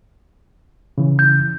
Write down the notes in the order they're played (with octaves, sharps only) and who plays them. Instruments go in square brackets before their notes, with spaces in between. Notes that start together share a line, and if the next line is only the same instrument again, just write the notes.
[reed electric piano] C#3 E3
[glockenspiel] G6